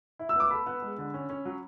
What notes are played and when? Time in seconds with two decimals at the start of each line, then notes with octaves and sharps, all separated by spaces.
0.19 E4
0.29 E6
0.36 B3 D6
0.50 A4 B5
0.66 B3
0.82 G#3
0.98 D3
1.14 C#4
1.29 C#4
1.45 F#3